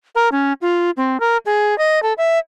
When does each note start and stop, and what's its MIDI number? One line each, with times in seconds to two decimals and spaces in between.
0.15 0.29 70
0.32 0.53 61
0.62 0.91 65
0.97 1.20 60
1.20 1.37 70
1.46 1.77 68
1.78 2.02 75
2.03 2.13 69
2.18 2.39 76